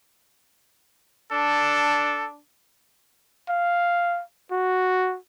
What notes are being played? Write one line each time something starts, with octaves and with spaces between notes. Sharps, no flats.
D4 A4
F5
F#4